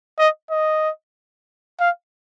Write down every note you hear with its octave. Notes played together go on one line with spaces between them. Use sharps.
D#5
D#5
F5